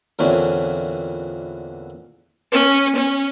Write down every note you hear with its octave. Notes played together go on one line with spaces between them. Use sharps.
E2 A#2 D3 E3 C4 C#4
C#4
C#4